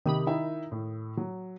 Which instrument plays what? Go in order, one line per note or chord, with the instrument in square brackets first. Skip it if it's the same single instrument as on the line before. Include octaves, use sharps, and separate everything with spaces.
[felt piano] C3 G4 D#6 [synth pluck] D#3 B5
[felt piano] D#4 E4 E5
A2
F#3